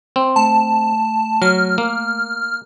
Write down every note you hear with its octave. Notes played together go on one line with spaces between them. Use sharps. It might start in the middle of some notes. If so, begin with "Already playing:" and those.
C4 C6
A3 A5
F#3 F6
A#3